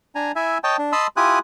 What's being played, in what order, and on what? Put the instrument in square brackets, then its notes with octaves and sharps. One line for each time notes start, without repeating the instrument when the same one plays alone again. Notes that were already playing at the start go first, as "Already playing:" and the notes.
[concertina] D4 G#5 A#5
E4 E5 G#5
C#5 D#5 G5 A5
D4
D#5 A5 B5 C6 D#6 E6
E4 F4 G4 G#5 D#6 F#6